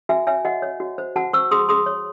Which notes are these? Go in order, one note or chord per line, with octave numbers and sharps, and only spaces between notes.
F#4 E5 G#5
C#5 E5 G#5
F#4 D#5 F#5
C#5
F#4
C5
F#4 F#5 A5
C5 C#6 E6
G#4 C6 D#6
G#4 C6 D#6
C#5